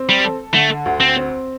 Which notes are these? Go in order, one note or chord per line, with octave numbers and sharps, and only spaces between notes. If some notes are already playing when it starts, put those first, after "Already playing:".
Already playing: C4
G3
A4
D3 A3
D2
C4
C4